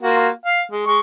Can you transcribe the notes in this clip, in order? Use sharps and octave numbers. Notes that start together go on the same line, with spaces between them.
A#3 F4 F#4
F5
G#3
G#3 C#6